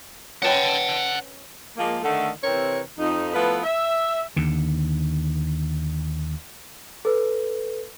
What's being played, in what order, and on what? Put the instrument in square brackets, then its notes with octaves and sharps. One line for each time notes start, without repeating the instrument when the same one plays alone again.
[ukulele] C#4 B4 G5 [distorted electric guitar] F#5 A5
[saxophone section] F3 G#3 A#3
D3 D#3 A3
C3 E3 C4 A#4 C#5
F2 D#4
F3 A3 B3 E4 B4
E5
[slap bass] D#2 D3
[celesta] A4 B4